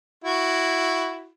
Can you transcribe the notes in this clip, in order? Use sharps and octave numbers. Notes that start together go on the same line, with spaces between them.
E4 F#4